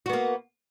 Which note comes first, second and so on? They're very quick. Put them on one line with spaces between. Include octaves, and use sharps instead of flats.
F#4 B3 A#3